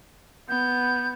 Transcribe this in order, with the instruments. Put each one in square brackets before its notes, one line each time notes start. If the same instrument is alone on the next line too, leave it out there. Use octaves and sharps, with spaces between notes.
[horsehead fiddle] B3 [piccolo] G6